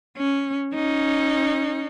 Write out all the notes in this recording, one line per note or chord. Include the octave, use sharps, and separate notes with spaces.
C#4
C#4 D#4